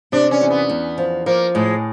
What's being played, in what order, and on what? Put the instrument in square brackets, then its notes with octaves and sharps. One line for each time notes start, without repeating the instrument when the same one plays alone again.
[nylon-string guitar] C3 [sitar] D4
[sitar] C#4
[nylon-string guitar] E2
[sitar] B3
[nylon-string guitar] E2
F3
[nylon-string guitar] F3 [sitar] A#3
[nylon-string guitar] A2 [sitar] G#3